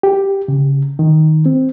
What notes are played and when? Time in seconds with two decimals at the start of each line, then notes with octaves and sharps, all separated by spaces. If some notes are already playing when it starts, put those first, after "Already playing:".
0.03 G4
0.48 C#3
0.99 D#3
1.46 C4